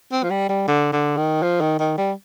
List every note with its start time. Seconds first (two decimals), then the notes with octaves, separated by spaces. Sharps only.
0.12 C4
0.23 F3
0.30 G3
0.49 G3
0.68 D3
0.93 D3
1.17 D#3
1.43 F3
1.61 D#3
1.79 D#3
1.98 G3